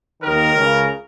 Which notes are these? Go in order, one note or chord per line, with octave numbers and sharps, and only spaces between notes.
D#2 D#3 A#4
C#2 C#3